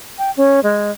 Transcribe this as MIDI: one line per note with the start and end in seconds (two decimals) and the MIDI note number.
0.18 0.31 79
0.37 0.60 61
0.63 0.91 56